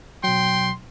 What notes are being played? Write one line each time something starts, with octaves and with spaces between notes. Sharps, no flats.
B2 F#3 G5 C6